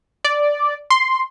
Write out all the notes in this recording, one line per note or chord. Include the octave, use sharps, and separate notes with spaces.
D5
C6